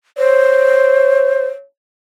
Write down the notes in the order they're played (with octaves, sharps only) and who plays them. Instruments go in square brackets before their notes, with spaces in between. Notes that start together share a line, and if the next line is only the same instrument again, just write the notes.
[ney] C5 [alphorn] C#5